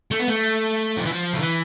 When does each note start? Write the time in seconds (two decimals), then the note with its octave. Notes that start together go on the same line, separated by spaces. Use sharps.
0.11 A3
0.20 B3
0.28 A3
0.97 F3
1.05 E3
1.12 F3
1.33 D3
1.39 E3